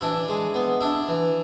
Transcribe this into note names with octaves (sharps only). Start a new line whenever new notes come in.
E3 D4 E4
G#3
B3
D4 E4
E3